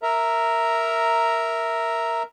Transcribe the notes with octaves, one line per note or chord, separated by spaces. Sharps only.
A#4 E5 A#5